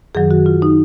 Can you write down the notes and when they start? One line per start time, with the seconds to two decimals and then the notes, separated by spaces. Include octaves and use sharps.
0.15 F#2 D#3 F#3 G#4
0.31 F#4
0.46 F4
0.62 D#4